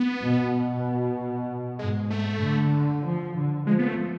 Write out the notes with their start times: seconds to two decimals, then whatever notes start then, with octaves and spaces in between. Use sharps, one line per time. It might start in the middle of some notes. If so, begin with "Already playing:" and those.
Already playing: B3
0.22 B2
1.79 G#2 G#3
2.10 A3
2.42 D3
3.04 F3
3.35 D3
3.66 F3 G#3
3.79 B3
3.88 A3